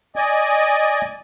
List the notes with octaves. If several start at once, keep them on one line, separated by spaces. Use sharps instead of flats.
D5 D#5 G#5